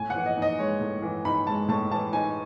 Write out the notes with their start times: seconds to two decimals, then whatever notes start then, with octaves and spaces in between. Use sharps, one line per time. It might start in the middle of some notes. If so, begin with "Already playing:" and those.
Already playing: A2 G#5
0.10 E3 F#5
0.26 D#5
0.37 D#4 D#5
0.58 G#3 C#5
0.81 A2
1.02 E3
1.25 D#4 B5
1.47 G#3 A5
1.68 A2 A5
1.91 E3 A5
2.13 D#4 G#5